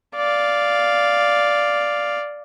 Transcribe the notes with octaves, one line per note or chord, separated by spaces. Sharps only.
D5 F5